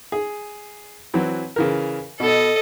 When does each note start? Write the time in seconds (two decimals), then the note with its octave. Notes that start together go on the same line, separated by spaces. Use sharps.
0.12 G#4
1.14 E3 F#3 C4
1.56 C#3 E3 A#4
2.20 B2 A4 D#5